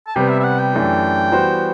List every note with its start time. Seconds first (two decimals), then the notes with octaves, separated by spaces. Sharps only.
0.07 A5
0.15 C3 G3 B3 G5
0.29 E5
0.40 E5
0.44 F#5
0.59 G5
0.73 F#2 E3 A3 D4 G4
1.32 E3 G3 B3 F#4 C5